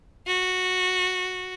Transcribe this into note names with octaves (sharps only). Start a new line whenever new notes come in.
F#4